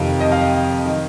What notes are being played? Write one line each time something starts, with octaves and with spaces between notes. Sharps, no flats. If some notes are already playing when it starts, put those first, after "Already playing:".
Already playing: F2 C3 D#3 F5
D#5
F5
D#3